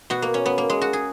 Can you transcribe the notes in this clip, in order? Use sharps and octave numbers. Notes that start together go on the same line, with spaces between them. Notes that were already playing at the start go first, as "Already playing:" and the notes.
B2 F#4
A#3
C#4
B3
A#3
G#3
F#4
G#4